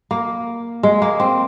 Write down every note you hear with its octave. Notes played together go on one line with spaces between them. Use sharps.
A#3
G#3
A#3
C4